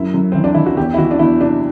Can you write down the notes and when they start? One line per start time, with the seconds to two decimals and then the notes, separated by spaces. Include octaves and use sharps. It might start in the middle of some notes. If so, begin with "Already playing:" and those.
Already playing: F#2 E4
0.14 F#2
0.32 E3 C4
0.44 D4
0.54 E3 E4
0.66 F#4
0.77 E2 G4
0.94 E4
0.98 E3 F#4
1.11 D4
1.19 E2 E4
1.40 C3 D4